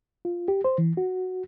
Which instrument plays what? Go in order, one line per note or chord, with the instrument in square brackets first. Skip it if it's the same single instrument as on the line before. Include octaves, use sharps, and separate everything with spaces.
[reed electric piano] F4
G4
C5
E3
F#4